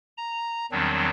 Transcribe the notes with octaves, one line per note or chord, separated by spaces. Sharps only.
A#5
E2 D#3 F#3 G3 C4 D4